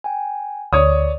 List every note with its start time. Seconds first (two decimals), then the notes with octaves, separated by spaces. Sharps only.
0.04 G5 G#5
0.73 D2 C#5 D5 D#6